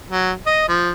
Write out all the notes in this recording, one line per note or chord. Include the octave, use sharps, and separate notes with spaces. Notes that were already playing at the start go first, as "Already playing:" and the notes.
F#3
D#5
F3